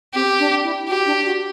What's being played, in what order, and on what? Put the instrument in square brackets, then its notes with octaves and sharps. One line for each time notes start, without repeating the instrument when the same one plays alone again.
[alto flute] C4 [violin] G4
[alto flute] D4
E4
[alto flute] F#4 [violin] G4
[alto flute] D4
F#4